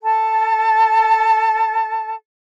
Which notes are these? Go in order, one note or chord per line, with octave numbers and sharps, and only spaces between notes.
A4 A5